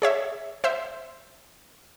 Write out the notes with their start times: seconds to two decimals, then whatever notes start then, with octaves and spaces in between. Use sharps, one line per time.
0.02 G#4 C#5 E5
0.64 C5 E5